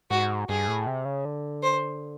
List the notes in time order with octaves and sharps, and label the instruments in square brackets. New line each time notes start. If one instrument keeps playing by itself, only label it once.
[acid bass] G#2 [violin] F#4
[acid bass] G2 [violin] G#4
[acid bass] A2
C3
C#3
D3
[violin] C5